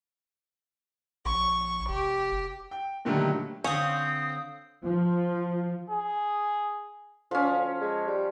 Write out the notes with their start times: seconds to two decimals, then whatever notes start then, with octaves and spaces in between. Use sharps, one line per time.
1.26 A#1 C#6
1.89 F1 G4
2.71 G5
3.05 A#2 D3 D#3 F#3 G3 A3
3.64 D3 C4 C#4 F5 D#6
4.83 F3
5.90 G#4
7.31 D2 F3 C#4
7.81 G#3
8.08 G3